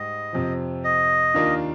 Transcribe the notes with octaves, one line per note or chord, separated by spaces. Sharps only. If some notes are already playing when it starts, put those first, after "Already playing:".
Already playing: G#2 G3 D#5
F2 C3 F3
D#5
D#2 D#3 A#3 D4 F4